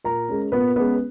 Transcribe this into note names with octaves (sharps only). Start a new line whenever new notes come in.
A#2 A#4 A#5
G#3 C#4
A#2 B3 B4
G#3 B3 C#4 B4